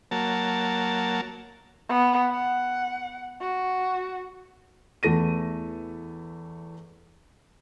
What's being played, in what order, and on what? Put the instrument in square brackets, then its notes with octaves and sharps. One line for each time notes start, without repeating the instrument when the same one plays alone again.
[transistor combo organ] F#3 A#3 A5
[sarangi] B3
F#5
F#4
[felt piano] E2 E3 A3 A#6 D#7